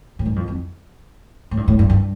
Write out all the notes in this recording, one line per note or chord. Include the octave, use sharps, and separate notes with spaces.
A2
G2
F2
F2
A2
G2
A2
G2
G2